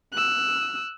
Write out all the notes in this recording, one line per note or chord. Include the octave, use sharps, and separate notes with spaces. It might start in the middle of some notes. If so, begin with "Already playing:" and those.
E6 F#6